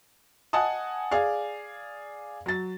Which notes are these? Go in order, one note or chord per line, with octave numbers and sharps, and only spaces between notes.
D#5 F#5 G#5 A5 D#6
G#4 D5 F5
F#3 A6